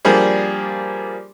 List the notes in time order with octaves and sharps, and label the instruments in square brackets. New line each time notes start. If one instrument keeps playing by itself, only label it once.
[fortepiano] F3 G3 A#3 D4 G#4